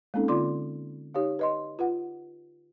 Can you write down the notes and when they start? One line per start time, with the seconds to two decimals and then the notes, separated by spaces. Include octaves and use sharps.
0.14 G#3 A#3 C4 C#4 D#4 A4
0.28 D3 F4 D5 C6 D6
1.14 D#4 G4 C#5 F5
1.39 B4 D#5 C6
1.79 F4 B4 F#5